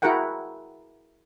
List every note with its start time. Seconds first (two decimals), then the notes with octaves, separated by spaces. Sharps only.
0.02 E4 F#4 G#4 A#4 F#5 G5